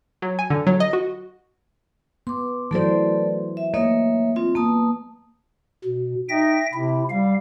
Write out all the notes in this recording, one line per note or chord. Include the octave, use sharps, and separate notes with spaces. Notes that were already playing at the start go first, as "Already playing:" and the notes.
F#3
G#5
D3
F#3
D#5
F#4
B3 C6 D6
E3 F#3 A3 A4 C5 D5
E5
A3 A#3 C#5 D#5 E5
C4 F4
A#3 B3 A5 D#6
B2
D#4 E5 G5 A#6
C3 E4
G3 F5